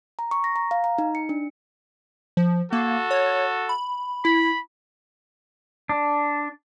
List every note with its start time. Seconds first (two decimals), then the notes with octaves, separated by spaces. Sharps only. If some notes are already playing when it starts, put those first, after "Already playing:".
0.19 A#5
0.31 C#6
0.44 A#6
0.56 A#5
0.71 F5
0.84 A#5
0.98 D#4
1.15 C#7
1.29 D4
2.37 F3
2.72 A#3 F#4 A4
3.11 C#5
3.69 B5
4.25 E4 B5
5.89 D4